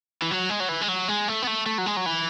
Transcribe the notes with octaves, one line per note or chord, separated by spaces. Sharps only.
E3
F#3
G#3
F#3
E3
G#3
F#3
G#3
A3
B3
A3
A3
F#3
G#3
F#3
E3